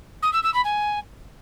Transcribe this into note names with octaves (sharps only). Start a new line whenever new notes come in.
D#6
E6
E6
B5
G#5